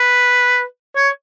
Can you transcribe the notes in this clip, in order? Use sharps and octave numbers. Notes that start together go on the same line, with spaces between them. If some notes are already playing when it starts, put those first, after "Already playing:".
Already playing: B4
C#5